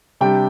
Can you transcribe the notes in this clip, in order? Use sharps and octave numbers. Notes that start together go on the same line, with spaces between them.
C3 G3 D4 G5